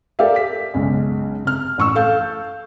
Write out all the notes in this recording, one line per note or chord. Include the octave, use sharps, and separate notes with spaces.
G4 A4 A#4 D5 E5 F5
B6
B1 C#3 G#3
C3 F6
A1 C#6 E6
A4 F5 G6